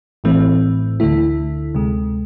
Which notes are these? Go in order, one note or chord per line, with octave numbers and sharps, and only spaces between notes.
A1 A2 E3 A3 C4
D2 D3 A3 E4
D2 C3 G#3